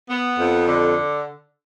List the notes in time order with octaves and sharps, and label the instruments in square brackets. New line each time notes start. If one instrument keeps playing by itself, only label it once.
[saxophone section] B3
F2
D3